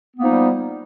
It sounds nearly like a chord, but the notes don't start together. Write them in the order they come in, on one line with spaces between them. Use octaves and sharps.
B3 A#3 F3 D#4 G3